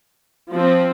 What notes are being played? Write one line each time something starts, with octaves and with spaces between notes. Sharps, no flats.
F3 C4